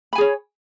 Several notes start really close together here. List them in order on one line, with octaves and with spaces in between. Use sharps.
B5 G#5 G#4 C#5